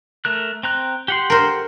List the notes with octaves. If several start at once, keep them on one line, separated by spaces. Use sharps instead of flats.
A3 A#4 F#6
C4 A#5 F#6
G4 F#5 C6
A#4 C5